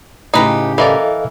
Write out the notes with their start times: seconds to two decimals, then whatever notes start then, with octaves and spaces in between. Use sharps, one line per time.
0.34 A2 C#3 D#4 G4 B4 A#5
0.78 E3 A4 A#4 D5 D#5 F5